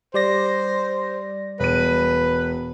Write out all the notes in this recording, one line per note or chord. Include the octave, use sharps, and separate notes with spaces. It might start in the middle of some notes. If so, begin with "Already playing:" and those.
G3 C5 D5 A#6
E1 B4 D#7